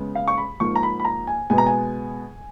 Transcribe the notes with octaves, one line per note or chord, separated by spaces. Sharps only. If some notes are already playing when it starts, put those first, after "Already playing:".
Already playing: C#3 G#3 B3
F5
C#6
B5
G#2 F3 A#3 C#6
A#5
B5
B5
A#5
G#5
B2 G#3 B3 G#5
A#5
G#5